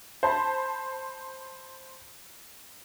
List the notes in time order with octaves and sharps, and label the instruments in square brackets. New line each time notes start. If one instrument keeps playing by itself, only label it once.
[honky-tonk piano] C5 A5 B5